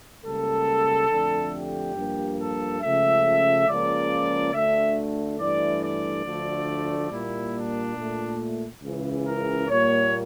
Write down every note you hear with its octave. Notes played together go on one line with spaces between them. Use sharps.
C#2 C#3 G3 A#3 A4
F2 D3 A3
G4
G2 F3 A#3
A4
C#2 C#3 F3 A3 E5
C#2 C#3 F3 A#3 D5
D2 D3 A3 E5
G2 E3 A3 D5
D5
D2 D3 F3 A3
A#2 G3 A#3 E4
D4
A#2 A3
C#2 C#3 E3
A#4
A#2 G3 A#3 C#5